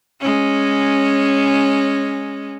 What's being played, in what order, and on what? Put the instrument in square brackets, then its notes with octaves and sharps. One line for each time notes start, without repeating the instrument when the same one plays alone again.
[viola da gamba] G#3 C#4